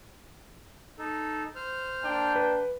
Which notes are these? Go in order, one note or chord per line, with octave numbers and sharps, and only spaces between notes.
D#4 A4
C5 F6
A#3 D4 G5
B4